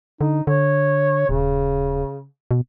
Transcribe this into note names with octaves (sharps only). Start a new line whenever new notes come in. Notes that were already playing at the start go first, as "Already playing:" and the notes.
D3 D#4
D3 C#5
D#1 C#3
B2